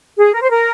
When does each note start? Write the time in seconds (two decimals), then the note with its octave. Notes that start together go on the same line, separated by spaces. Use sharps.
0.17 G#4
0.33 A#4
0.42 C5
0.50 A#4